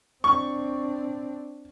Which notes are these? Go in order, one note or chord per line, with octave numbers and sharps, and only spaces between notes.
C4 D4 C#6